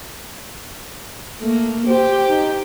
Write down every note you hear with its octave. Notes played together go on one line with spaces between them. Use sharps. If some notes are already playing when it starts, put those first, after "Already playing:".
A3 A#3
G4 C5
D#4